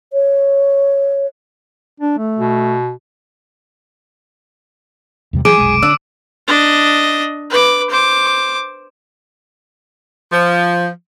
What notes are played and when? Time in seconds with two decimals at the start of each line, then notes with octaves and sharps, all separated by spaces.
0.13 C#5
2.00 D4
2.18 A3
2.38 B2
5.33 E2 C3 G3
5.45 E3 F#3 G#4 D6 D7 D#7
5.58 F1 B1 G#3
5.83 D3 D4 E6
6.48 D4 D#5
7.50 B4 D6
7.90 C5 D6
10.32 F3